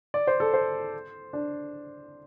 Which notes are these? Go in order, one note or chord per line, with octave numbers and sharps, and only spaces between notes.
D5
C5
A4
C5
D4